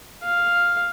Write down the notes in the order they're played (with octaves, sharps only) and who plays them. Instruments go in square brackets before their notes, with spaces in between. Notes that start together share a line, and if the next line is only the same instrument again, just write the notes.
[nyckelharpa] F5